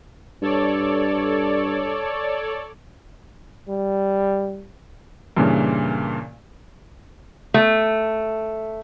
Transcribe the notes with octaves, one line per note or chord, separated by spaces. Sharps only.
G2 A4 C#5 D5
G3
G2 A#2 C#3 E3
A3